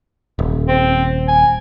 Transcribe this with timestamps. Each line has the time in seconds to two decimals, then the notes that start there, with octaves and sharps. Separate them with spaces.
0.39 D#1
0.68 C4
1.28 G#5